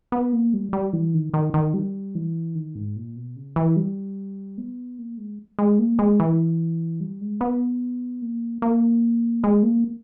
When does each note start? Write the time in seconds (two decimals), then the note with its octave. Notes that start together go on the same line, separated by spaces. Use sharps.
0.12 B3
0.33 A#3
0.54 G3
0.73 G3
0.93 E3
1.14 D#3
1.34 D#3
1.54 D#3
1.74 G3
2.15 E3
2.55 D#3
2.75 G#2
2.96 A#2
3.16 B2
3.36 C#3
3.56 E3
3.76 G3
4.58 B3
4.99 A#3
5.18 G#3
5.59 G#3
5.79 A#3
5.99 G#3
6.20 E3
7.00 G3
7.21 G#3
7.41 B3
8.22 A#3
8.62 A#3
9.44 G#3
9.63 A#3